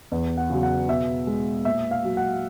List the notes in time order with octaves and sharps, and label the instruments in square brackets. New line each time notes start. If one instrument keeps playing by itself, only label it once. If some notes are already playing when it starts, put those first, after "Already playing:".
[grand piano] E2
F#5
C#3 F#3
F#5
B2 E5
G#3
A#2 E5
F5
F#3
F#5